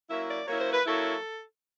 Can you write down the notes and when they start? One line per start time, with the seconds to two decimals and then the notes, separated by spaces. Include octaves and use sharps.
0.10 F#3 A#3 C#4 E4 E5
0.29 D5
0.47 F#3 A#3 C#4 E4 C#5
0.60 C5
0.73 B4
0.85 F#3 A#3 C#4 E4 A4